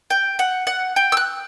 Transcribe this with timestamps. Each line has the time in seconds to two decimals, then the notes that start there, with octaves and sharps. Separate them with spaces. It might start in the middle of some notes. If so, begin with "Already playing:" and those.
0.10 G5
0.39 F#5
0.67 F#5
0.96 G5
1.12 E6
1.17 F#6